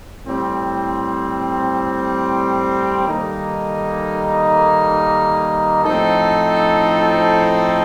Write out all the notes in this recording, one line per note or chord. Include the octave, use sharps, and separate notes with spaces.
A2 G3 C4
D#3 G3 A#3 D#4 A4
A2 F3 C4 D#4 A4